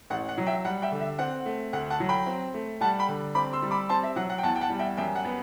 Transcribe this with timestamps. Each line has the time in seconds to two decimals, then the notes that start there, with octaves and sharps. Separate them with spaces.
0.10 A1 F#5
0.29 F#5
0.38 F#3
0.46 E5 G5
0.65 G3 F#5
0.82 E5 G5
0.92 D3
1.00 E5
1.19 C4 F#5
1.46 A3
1.73 D2 F#5
1.90 F#5 A5
2.00 F#3
2.09 G5 B5
2.26 C4
2.54 A3
2.81 G3 F#5 A5
2.99 G5 B5
3.08 D3
3.35 C4 B5 D6
3.53 C6 E6
3.62 G3
3.71 B5 D6
3.89 C4 A5 C6
4.03 E5
4.16 F#3 F#5
4.30 F#5
4.38 G5
4.43 E2 F#5 A5
4.56 G5
4.61 F#5 A5
4.70 G3
4.79 E5 G5
4.97 F#2 E5 G5
5.15 F#5
5.25 B3